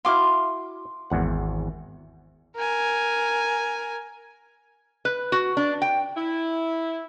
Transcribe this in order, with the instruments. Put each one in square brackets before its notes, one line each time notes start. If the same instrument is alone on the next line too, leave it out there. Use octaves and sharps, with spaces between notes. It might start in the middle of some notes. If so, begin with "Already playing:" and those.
[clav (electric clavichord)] E4 F#4 F5 [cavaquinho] C6 D6
[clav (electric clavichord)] G#1 E2 F#5
[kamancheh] A#4 G#5
[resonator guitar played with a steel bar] B4
F#4
D4
G5
[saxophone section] E4